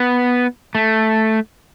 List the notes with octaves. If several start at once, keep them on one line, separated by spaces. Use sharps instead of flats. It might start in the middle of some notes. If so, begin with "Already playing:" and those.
Already playing: B3
A3